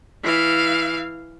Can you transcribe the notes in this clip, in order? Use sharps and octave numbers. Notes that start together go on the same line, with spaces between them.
E3 F5